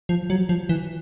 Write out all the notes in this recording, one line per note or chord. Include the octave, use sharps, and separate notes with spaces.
F3
F#3
F3
E3